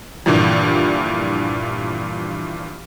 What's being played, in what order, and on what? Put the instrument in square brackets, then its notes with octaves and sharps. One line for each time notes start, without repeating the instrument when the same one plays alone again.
[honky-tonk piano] G2 A#2 D3 E3 F3 G3